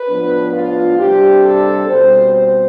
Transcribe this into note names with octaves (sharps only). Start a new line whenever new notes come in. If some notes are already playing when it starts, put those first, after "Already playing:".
Already playing: B4
A2 F3 B3 D4
F4
C3 G3 D4 G4
A4
B2 G3 C4 C5
C5